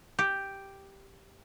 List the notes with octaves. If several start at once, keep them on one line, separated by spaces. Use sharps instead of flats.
G4